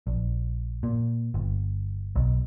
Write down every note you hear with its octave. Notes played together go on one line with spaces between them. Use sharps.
A#1
A#2
G1
B1